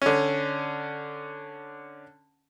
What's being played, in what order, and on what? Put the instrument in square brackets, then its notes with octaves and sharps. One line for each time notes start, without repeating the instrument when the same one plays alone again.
[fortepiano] D3 C#4